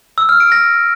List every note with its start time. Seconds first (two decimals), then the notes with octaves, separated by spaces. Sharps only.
0.18 E6
0.29 F6
0.40 D7
0.52 A#6